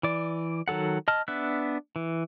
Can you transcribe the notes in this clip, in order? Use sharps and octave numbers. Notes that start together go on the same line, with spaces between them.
E3 D5
D#3 F#3 A4 F#5
D#5 A5 F6
B3 D4 E5 F#6
E3